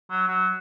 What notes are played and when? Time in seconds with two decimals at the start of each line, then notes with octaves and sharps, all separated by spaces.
0.10 F#3
0.28 F#3